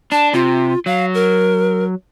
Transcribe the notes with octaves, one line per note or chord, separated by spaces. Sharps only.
D4 A5
C3 F4
F#3 F5
A#4